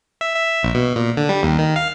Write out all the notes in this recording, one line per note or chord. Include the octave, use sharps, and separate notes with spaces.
E5
E5
A#1
B2
A#2
D3
G3
D#2
D#3
F5